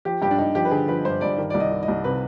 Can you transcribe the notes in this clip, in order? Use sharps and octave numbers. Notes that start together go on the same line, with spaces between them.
F3 G4
G2 G4
D4
G2 D#4
F3 G4
B4
D3 G#4
F3 B4
G2 C5
G2 D5
D#3
C2 D5
D#5
D#3
D#5
C2
C3 B4